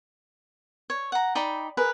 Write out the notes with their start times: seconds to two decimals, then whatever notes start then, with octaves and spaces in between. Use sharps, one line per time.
0.90 C#5
1.12 F#5 A#5
1.35 D#4 D5 G5 B5
1.77 G#4 A#4 B4